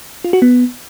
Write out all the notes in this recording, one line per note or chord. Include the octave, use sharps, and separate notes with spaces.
F4
F#4
B3